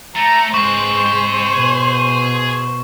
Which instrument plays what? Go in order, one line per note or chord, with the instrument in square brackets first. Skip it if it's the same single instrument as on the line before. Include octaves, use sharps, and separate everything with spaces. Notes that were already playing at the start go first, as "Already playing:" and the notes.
[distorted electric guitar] A3 [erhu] A#5
[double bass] G#2 G#3 [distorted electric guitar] C4 B4 [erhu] C5 [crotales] C#6
[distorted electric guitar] G4 C6
[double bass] B2 [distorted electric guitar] G#4